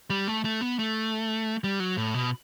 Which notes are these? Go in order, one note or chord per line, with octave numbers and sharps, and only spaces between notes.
G3
A3
A3
B3
A3
G3
F#3
A2
B2